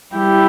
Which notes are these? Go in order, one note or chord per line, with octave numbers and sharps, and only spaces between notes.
G3 E4 G4